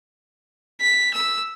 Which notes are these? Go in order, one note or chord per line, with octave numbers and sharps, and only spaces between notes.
B6
E6